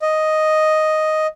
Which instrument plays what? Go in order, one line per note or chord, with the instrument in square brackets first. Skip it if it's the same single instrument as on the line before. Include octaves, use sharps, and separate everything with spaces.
[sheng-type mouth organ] D#5